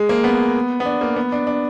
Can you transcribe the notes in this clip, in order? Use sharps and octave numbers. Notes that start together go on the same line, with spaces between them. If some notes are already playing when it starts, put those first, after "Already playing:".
Already playing: G#3
A#3
B3
B3
D4
A#3
B3
D4
D4